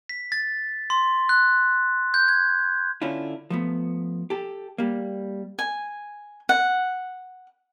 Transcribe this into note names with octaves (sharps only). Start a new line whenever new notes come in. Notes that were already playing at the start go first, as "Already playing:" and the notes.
B6
A6
C6
F#6
G6
G#6
D3 C#4 D4 E4 F4
F3 A3 B3
G4 A4
G3 A#3
G#5
F#5